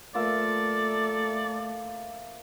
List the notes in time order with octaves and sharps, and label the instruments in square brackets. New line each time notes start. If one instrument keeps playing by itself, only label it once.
[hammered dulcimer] F3 A#3 E5 [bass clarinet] A3 [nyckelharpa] A4 [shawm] D5